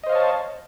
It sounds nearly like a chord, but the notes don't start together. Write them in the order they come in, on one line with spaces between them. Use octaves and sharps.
D#5 C5 F5 C#5 A5